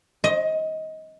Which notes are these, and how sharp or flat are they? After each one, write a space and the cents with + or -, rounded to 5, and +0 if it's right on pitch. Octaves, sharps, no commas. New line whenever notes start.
D#5 +20